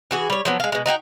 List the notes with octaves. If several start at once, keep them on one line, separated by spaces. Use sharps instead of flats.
E3 F#4 G#4
G3 C#5
F3 F#3 B3
G#3 F5
B2 G#3
D#4 F#4 G4 G5